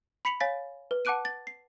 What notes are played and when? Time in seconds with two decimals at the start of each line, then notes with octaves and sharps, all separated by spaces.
0.25 B5 B6 C#7 F7 F#7
0.40 C#5 F5 G#5 A6 B6
0.91 B4
1.05 F#5 A5 D6 F#6 D7 D#7
1.25 A6
1.47 C7